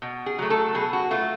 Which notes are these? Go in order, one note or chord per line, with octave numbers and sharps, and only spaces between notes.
B2
G#4
F#3 A3
A4
B2 G#4
F#4
A3 F4